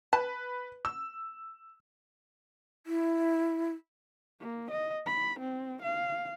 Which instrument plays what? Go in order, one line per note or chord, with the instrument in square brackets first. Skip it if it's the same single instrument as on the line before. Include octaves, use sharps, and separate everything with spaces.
[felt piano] B4 [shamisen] A5
[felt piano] E6
[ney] E4
[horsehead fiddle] A#3
D#5
B5
C4
F5